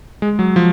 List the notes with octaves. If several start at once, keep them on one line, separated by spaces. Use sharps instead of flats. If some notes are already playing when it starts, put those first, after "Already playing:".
G#3
F#3
F3